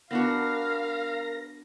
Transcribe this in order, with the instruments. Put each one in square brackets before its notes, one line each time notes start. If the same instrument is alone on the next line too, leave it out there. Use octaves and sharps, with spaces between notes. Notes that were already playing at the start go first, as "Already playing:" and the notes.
[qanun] B3 D4 F#4 [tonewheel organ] A#4 A#6 [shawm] F5